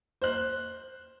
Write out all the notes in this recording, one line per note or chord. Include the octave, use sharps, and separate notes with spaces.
C5 F#6